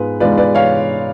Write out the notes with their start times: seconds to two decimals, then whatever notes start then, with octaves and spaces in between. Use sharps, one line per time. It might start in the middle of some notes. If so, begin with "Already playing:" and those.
Already playing: G#2 G#3 B3 F4 B4
0.20 G#2 G#3 B3 F4 B4 D5
0.37 B4 D5
0.55 C#5 F5